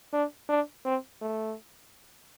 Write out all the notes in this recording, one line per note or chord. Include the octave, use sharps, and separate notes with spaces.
D4
D4
C4
A3